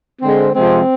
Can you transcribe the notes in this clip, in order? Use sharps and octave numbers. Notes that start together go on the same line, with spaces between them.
D3 G#3 C4
C3 F3 G#3 C4